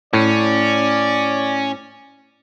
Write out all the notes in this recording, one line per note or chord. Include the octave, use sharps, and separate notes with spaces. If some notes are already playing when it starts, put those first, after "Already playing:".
A2 C#4 D5